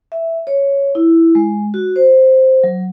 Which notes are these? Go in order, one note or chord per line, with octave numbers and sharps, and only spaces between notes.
E5
C#5
E4
G#3
F#4
C5
F#3